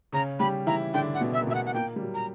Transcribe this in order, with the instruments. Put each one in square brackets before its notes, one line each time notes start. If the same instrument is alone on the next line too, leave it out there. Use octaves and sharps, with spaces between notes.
[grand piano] C#3 C#4 [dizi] A#5
[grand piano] G3 G4 [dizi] B5
[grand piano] E3 E4 [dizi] A#5
[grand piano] D3 D4 [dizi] G5
[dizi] F#5
[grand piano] B2 B3
[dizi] E5
[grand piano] A#3
[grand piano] B2 B3 [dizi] E5
[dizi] F#5
F#5
[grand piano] A#2 A#3 [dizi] G5
[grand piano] G3
F#3
[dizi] A#5